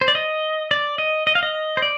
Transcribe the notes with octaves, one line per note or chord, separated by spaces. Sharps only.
C5
D5
D#5
D5
D#5
D#5
F5
D#5
C5
D5